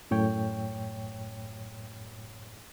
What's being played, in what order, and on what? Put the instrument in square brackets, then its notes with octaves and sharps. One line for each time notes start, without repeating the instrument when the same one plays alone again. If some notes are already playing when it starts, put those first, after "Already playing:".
[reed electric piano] F#2 A2 C#5 G5